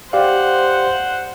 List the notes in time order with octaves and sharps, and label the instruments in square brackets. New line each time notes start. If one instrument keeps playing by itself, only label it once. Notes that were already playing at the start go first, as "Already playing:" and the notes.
[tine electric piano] G4 D5 F5 [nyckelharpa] C5 F#5